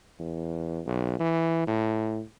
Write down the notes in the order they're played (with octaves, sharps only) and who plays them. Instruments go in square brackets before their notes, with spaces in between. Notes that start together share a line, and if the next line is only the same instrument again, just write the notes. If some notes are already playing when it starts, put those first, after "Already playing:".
[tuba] E2
B1
E3
A2